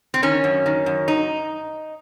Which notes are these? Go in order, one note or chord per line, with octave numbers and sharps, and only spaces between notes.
C4
D#3 C#4
F#2
D#3
F#2
D#4